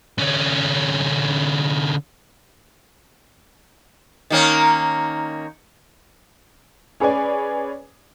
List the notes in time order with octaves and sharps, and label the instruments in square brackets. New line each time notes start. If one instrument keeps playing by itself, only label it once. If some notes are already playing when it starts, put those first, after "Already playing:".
[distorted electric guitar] D3 C#4
[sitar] D#3 A#3 C#4
[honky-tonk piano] C#4 G#4 B4 D5 G#5